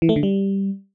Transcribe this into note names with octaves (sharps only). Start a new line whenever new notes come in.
E3
A3
D3
G3